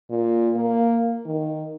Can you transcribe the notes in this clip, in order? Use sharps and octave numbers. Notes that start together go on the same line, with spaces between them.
A#2
A#3
D#3